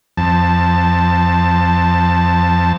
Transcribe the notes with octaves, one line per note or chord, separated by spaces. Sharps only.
F2 A5